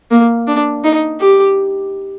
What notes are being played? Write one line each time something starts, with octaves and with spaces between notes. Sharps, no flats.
A#3
D4
D#4
G4